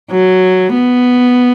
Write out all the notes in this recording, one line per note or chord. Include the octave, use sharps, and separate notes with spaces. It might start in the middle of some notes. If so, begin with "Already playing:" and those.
F#3
B3